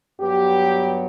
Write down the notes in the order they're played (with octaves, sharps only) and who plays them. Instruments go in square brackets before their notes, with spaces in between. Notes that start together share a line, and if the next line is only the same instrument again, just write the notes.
[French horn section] G2 F#3 B3 G4